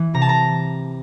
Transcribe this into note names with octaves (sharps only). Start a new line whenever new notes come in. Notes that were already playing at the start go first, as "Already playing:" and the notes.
Already playing: E3
C3 A#5
A5
A#5